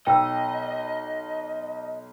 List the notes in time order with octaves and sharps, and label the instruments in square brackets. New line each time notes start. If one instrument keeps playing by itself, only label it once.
[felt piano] B1 [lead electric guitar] D#5 [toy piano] G5 E6